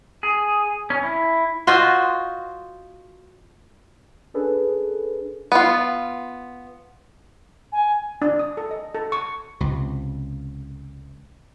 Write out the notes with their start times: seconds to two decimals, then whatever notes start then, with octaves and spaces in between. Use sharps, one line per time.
0.23 G#4
0.90 C#4
1.03 E4
1.67 F4 F#4 C5 D#5
4.34 C#4 D4 G#4 A4 B4
5.52 B3 F4
7.72 G#5
8.22 D4
8.39 D#6
8.57 A4
8.71 D#5
8.95 A4
9.12 C#6
9.61 C#2 C3